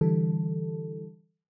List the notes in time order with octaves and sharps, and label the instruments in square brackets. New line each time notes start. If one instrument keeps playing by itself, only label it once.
[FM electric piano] D3 E3 G3 A4